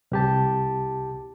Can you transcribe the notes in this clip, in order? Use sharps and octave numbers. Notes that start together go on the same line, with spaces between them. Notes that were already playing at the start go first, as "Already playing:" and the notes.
C2 G4 A5